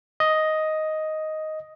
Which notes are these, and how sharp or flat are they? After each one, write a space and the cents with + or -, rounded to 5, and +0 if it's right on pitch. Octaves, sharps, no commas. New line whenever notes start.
D#5 +5